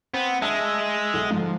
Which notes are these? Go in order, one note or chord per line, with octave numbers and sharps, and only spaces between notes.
B3 C4
G#3 D4 E5 A5 E6
B1
G#2 D3 F3